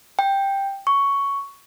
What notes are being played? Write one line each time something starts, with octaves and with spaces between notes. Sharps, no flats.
G5
C#6